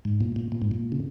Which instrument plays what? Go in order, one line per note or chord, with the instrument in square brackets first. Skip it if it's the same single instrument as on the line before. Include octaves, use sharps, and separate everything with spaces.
[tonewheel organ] G#2
A#2
A#2
A#2
G#2
A#2
C#3